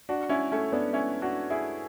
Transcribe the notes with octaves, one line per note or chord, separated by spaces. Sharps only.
D4 F#4
C#4 E4
A3 C#4
B3 D4
C#4 E4
D4 F#4
E4 G#4